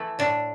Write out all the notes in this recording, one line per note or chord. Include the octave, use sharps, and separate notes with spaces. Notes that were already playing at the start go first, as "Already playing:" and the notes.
Already playing: E3 A3
A2 D4